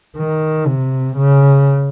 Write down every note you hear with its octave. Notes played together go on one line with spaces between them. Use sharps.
D#3
C3
C#3